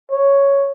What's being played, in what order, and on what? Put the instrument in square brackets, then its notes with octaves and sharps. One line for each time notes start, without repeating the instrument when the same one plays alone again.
[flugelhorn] C#5